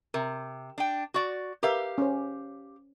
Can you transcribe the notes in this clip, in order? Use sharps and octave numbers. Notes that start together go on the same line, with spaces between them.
C3 A#4
D4 G5
F#4 D5
G4 A#4 B4 E5 F5
C#4 C5